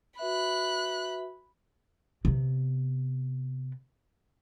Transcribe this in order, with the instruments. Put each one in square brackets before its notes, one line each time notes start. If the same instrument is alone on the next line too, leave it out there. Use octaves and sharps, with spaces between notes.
[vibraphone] F#4 B4 E5 [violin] B5 F#6
[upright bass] C3 B3